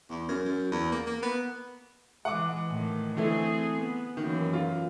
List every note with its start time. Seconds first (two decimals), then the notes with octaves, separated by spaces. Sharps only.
0.10 E2
0.29 F#2
0.45 F#2
0.72 E2
0.92 A#3
1.06 A#3
1.23 B3
2.25 E3 G#3 F#5 D6
2.68 A2 D#3
3.17 D3 E3 A3 C4 G#4
3.78 B3
4.17 F#2 D#3 E3 A#3
4.53 F4